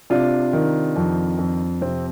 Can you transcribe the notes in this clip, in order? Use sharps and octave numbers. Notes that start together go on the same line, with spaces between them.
C3 D4 F4
D#3
F2
F2
C3 C4